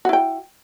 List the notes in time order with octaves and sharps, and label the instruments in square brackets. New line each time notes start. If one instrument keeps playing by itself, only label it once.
[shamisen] F#4
E4
G5